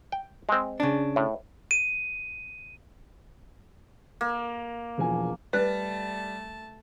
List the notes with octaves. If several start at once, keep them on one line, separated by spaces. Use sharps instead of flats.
G5
G#3 C4
C#3 D4
A2
D#7
A#3
E1 F3 G#5
G3 A3 B4 A5 F#6